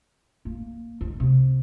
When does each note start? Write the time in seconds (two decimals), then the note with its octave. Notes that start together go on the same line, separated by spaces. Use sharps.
0.45 A#3
1.01 D#3
1.20 C3